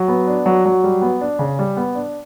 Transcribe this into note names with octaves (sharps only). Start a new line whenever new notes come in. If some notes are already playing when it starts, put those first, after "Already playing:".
Already playing: F#3
B3
D4
F#3
F#3
G3
B3
D4
C#3
G3
B3
D4